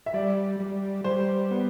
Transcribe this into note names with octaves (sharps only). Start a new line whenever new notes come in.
E5
G3 D5
G3
G3 C5
B3